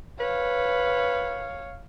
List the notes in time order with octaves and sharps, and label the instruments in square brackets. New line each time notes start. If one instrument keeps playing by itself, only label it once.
[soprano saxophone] B4 [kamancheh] C#5 F5